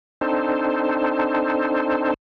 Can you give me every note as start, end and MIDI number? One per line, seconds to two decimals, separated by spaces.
0.21 2.14 60
0.21 2.14 62
0.21 2.14 63
0.21 2.14 69
0.21 2.14 72